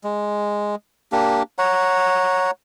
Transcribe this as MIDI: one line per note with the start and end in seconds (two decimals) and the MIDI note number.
0.04 0.75 56
1.12 1.43 58
1.12 1.43 62
1.12 1.43 67
1.58 2.51 73
1.58 2.51 78
1.58 2.51 82